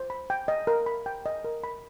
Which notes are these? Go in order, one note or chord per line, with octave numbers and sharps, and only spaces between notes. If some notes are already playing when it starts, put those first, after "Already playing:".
Already playing: C5
B5
G5
D#5
A#4
B5
G5
D#5
A#4
B5